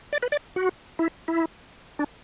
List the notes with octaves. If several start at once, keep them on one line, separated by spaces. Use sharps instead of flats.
D5
B4
D5
F#4
E4
E4
D4